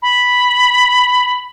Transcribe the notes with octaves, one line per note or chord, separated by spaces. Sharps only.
B5